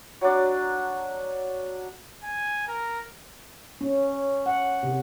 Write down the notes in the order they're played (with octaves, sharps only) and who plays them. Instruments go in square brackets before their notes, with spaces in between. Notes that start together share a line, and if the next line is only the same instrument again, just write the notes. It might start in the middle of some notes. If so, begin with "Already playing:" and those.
[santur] F#3 D4
[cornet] G#5
A#4
[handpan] C#4
F#5
C3